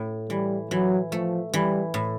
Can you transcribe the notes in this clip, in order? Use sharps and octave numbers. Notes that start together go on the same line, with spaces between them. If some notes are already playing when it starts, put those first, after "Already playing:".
Already playing: A2
E3 G3
E3 F#3
F3 A3
E3 G3
A2